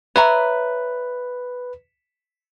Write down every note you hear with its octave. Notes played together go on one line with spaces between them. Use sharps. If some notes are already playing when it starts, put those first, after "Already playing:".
B4 C#5 E5 A#5